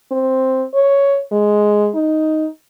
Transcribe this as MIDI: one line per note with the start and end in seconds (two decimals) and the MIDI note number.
0.11 0.65 60
0.74 1.21 73
1.32 1.90 56
1.95 2.48 63